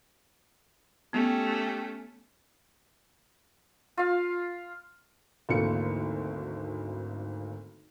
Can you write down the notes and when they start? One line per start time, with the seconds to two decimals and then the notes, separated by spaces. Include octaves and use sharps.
1.13 A3 B3 C#4 G4
3.97 F4 F5
5.49 G#1 D2 E3 A3 A#3 C#7